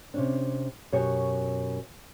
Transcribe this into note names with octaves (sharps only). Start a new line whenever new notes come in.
C3 C#4 D4
F#2 B2 G4 C#5